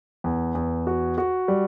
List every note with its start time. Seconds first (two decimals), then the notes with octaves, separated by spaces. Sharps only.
0.24 E2
0.55 E2
0.87 F#4
1.18 F#4
1.48 G3